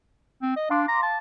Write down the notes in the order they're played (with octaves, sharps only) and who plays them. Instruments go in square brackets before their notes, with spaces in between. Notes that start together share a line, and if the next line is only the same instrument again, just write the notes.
[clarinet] C4
D#5
[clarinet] D4 [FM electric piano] F5 C6 D6
[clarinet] A#5
A5